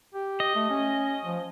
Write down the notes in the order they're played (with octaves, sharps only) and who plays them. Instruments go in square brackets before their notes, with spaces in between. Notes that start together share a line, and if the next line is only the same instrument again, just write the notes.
[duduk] G4
[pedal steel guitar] D#5
[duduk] A3
C#4
F3